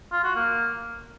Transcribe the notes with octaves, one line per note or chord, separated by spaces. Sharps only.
F4
F#4
A#3